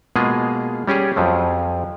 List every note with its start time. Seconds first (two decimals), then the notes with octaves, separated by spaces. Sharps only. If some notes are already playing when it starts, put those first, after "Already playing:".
0.16 B2 G#3 A#3 B3 F4 G#4
0.88 G3 C#4 G4 G#4
1.16 F2 F3 F#3